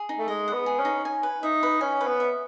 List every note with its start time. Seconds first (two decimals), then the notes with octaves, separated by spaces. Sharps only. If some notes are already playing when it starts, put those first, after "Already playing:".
Already playing: G#4
0.09 D#4
0.18 A3
0.28 G#3 D#5
0.48 F#5
0.53 B3
0.66 G#4
0.79 C#4
0.85 D#4
1.05 G#5
1.23 B4
1.43 D#4 E5
1.63 B4
1.81 C#4 G#5
2.01 B4
2.07 B3
2.20 E5